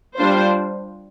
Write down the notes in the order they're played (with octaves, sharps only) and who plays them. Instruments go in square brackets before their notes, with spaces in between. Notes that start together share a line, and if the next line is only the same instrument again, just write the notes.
[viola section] G3 D4 F4 C5